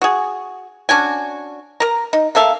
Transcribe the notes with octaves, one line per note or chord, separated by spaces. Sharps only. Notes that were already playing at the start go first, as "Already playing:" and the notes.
F#4 G#4
C#4 D4 F#4 G#5
A#4 A#5
D#4
A#3 A4 E5 F5